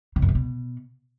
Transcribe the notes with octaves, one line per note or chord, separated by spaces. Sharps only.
C#3
F#2
C#3
B2